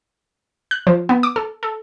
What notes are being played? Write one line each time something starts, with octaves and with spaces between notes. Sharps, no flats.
F#6
F3
B3
D6
A4
A4